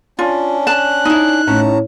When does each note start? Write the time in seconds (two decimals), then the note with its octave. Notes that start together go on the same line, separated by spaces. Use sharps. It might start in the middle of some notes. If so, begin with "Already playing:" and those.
0.19 C#4 D4 F4
0.67 A5 F#6
1.05 D#4 E4
1.47 A2 C#4 A5 A#5